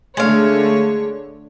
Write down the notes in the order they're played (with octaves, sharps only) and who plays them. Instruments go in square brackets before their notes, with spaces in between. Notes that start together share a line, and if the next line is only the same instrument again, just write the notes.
[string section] D3 A3 C#5 [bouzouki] G#3 F5